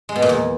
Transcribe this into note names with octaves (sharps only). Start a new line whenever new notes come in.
G#3
B2
A#2
E2